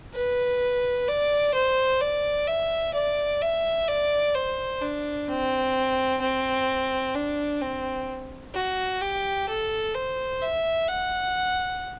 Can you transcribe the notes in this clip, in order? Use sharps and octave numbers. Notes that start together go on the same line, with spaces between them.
B4
D5
C5
D5
E5
D5
E5
D5
C5
D4
C4
C4
D4
C4
F#4
G4
A4
C5
E5
F#5